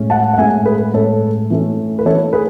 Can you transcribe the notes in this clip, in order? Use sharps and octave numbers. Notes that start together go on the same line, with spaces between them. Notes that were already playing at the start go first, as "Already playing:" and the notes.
Already playing: A2 G#3 C#4
F#5 A5
F#5
A2 G#3 C#4 E5 G#5
G#4 B4
A2 G#3 C#4 A4 C#5
E3 A3 C#4
B4
E3 A3 C#4 A4 C#5
G#4 B4